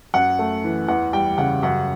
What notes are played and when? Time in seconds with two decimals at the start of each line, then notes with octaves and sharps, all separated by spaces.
0.14 F#2 F#5
0.39 A3
0.64 E3
0.88 E2 F#5
1.13 G3 G5
1.38 C#3 F#5
1.62 F#2 F#5